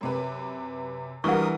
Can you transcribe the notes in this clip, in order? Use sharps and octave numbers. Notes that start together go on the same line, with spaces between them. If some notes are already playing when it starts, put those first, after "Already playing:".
F#2 C3 B4
E3 G3 D4 F#4 A#4 F#5 C#6 D#6